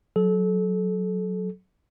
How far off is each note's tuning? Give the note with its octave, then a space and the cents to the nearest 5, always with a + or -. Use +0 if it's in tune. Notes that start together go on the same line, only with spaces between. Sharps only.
F#3 -5 A4 -30